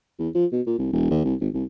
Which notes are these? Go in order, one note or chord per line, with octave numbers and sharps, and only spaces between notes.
E2
F3
B2
A#2
C2
E1
D#2
C2
G#1
C2